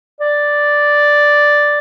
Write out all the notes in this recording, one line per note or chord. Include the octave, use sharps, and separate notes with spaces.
D5